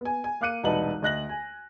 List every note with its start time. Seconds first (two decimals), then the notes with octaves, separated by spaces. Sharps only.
0.01 B3 G#5
0.24 G#5
0.41 A#3 F5 D6 F#6 C#7 D#7
0.63 E1 C2 D#4 B4 A5 F#7
1.02 D2 D#5 F#6 A#6 F#7
1.29 G#5